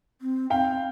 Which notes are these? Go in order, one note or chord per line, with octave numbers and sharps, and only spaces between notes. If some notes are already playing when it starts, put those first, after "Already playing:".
C4
C4 F5 G5